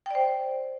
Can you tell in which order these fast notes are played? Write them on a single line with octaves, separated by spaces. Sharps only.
G5 D5 C5